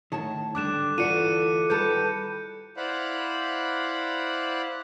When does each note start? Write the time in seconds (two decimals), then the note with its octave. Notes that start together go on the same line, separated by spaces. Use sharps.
0.12 A2 D#3 C#5 A5
0.55 D3 G3 D4 D6 F#6 E7
0.98 D2 E3 F4 F#4 A4 D5 C#7 D#7
1.70 D#3 G3 A4 B4 G6
2.77 E4 C5 D5 F5 F#5 B5